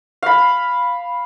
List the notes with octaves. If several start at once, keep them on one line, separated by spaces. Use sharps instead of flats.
F5 B5